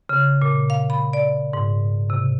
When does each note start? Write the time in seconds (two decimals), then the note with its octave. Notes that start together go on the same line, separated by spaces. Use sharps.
0.09 C#3
0.42 A#2
0.70 F5
0.90 B5
1.13 D5
1.53 G#2
2.10 C3